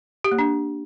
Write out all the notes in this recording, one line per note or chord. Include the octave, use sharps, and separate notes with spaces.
G4
A#3
D4